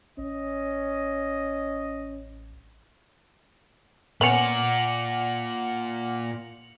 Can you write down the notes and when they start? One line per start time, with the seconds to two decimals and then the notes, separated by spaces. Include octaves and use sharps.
0.18 A1 C#4 D#5
4.21 A#2 B3 C#4 F#5 C#7 F7 F#7